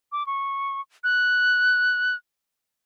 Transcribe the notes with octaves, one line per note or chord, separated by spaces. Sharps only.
D6
C#6
F#6